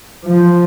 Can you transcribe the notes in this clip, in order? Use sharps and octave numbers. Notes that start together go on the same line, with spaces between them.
F3